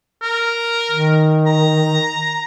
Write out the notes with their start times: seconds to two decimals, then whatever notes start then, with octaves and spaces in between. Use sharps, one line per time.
0.22 A#4
0.91 D#3
1.46 A#5